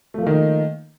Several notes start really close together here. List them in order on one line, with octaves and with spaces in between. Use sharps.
A3 F3 A#3 D#3 D#4